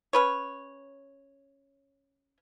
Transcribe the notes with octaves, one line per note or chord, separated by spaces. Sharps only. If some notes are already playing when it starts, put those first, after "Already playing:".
C#4 B4 C#5